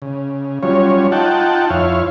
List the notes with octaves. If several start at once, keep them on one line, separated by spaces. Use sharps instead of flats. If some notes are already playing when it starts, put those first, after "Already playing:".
C#3
F#3 G3 C#4 F4 C#5
D#4 F4 F#5 G5 A5
F2 E4 C#5 F5